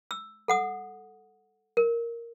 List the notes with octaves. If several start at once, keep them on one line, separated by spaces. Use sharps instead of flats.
E6
A4 F#5 D#6
A#4